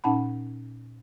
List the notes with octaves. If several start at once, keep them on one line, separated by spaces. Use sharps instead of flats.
A#2 C#4 D#4 F#5 A5 B5